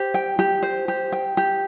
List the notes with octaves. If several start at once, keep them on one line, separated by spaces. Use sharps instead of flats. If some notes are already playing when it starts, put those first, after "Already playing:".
Already playing: G4 C5
G5
G4
C5
G4
G5
G4